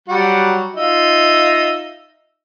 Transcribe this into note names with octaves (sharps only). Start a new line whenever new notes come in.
F#3 G3 F#4
D#4 F4 E5